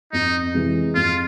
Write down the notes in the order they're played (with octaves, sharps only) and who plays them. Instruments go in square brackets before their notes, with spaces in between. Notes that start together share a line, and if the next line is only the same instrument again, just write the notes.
[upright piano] F2 [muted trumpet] D#4
[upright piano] C3 E3 G#3
[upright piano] F2 [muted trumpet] F4